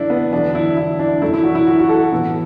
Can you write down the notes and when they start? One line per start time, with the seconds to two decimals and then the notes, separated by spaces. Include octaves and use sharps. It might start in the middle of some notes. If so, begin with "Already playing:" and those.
Already playing: F#2 D3 A3 D4 E4
0.10 B3
0.32 E2 D3 F#3 A3 D4
0.55 E4
0.77 E4
0.99 D4
1.21 F#2 E3 A3 E4
1.34 E4
1.44 F#4
1.55 E4
1.67 F#4
1.79 F#4
1.89 A4
2.12 A2 E3 B3